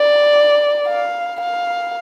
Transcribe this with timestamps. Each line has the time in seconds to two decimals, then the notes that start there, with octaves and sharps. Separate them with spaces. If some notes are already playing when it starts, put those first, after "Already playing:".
Already playing: D5
0.87 F5
1.41 F5